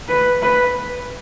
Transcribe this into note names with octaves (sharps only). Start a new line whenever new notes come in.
B4
B4